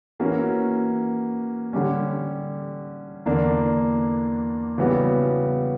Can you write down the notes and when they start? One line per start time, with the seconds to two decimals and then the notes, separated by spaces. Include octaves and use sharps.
0.20 E3 A#3 C#4 F#4
1.73 D3 G3 C#4
3.26 E2 D3 A#3 D4
4.78 C#3 E3 G3 B3 F#4